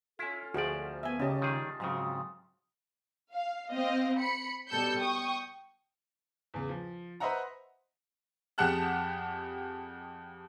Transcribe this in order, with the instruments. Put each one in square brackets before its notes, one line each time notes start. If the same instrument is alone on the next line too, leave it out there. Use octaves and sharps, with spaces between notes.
[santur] C#4 F4 [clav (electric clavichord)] E4 [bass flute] A4
[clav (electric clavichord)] D2 F3 D5 [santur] A3 A#3 [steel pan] F#4 G#4
[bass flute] B3 [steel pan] E5 G#5
[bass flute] C#3 [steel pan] C#4 G4 [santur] D#4 A5
[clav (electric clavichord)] D#3 G3 G#4 [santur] F4
[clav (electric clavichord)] G#2 C#3 [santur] F3 C4 D#6 [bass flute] F#3
[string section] F5
C4 D#5 F5
B5 C#7
B2 G3 A4 E6 G6 C#7
G5 C#6 D#6
[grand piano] E2 C#3
F3
B4 C5 D#5 E5 F#5 A#5
[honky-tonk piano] F2 G4 G#4 F#5 A5 F#6